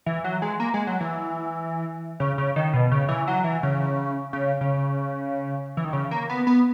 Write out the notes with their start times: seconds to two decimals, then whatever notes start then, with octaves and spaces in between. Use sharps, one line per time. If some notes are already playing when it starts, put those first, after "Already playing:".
0.06 E3
0.24 F#3
0.42 G#3
0.60 A#3
0.74 G#3
0.87 F#3
1.00 E3
2.20 C#3
2.38 C#3
2.56 D#3
2.73 B2
2.91 C#3
3.09 E3
3.28 F#3
3.44 E3
3.63 C#3
4.33 C#3
4.61 C#3
5.77 E3
5.85 D#3
5.93 C#3
6.11 A#3
6.29 B3
6.47 B3